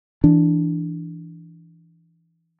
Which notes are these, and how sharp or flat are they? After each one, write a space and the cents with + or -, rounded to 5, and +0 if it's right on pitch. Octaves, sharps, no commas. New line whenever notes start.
E3 +5 D4 +0